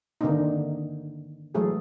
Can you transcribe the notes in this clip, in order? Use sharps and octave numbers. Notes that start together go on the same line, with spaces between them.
D3 D#3 A#3 C4 D4 D#4
E3 F#3 G#3 A3 G#4 A4